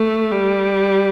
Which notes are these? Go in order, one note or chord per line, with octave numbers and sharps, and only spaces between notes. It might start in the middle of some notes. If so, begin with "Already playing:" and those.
Already playing: A3
G3